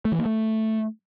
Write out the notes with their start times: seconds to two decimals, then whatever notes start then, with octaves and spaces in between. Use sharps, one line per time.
0.05 A3
0.12 E3
0.19 A#3
0.26 A3